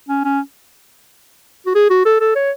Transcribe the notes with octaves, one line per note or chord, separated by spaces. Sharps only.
C#4
C#4
F#4
G#4
F#4
A4
A4
C#5